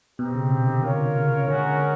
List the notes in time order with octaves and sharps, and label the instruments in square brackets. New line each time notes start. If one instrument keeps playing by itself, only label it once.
[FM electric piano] B2 [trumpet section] C4 D#4 G4
[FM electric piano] C#3
C3
D3
[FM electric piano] D3 [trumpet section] F4 A#4 C#5
[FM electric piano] C#3
[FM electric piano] D3 [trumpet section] G#3 C#4 F#4 A#4